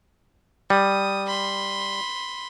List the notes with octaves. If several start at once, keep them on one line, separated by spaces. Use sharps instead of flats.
G3 D#6
B5 C6